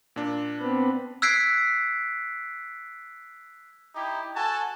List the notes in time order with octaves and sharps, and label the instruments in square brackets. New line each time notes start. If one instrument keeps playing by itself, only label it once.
[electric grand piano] A#2 D4
[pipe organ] B3 C4 B4
[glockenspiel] E6 F#6 G#6 B6 C7 D7
[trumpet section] D#4 E4 G4
F#4 A4 G#5 A5